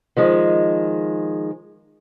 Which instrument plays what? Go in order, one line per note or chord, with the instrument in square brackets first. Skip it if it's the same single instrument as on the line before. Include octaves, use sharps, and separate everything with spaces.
[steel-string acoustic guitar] D#3 F3 G#3